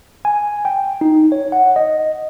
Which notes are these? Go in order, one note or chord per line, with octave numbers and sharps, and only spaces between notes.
G#5
G5
D#4
C#5
F#5
D#5